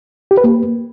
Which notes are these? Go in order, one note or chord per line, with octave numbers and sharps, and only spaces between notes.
G4
B4
A#3